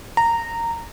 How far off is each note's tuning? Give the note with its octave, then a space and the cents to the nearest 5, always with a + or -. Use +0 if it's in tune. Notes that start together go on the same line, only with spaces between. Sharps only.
A#5 -15